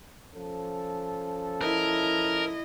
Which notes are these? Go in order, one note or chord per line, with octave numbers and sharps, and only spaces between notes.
F3 C#4 A4
E4 A#4 D#5